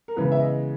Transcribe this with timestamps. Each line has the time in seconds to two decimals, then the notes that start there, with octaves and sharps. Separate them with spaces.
0.08 A#4
0.16 C#3 E3 G#3 B3 B4
0.32 E5
0.40 D#5